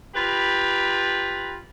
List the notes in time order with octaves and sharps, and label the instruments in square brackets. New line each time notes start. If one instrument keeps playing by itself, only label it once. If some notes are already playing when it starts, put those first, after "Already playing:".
[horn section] F4 G4 B4 A#5 B5